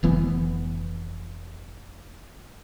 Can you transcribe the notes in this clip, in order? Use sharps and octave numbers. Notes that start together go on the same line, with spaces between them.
F1 E3 B3